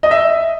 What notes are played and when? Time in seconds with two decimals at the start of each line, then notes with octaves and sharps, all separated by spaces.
0.03 D#5
0.11 E5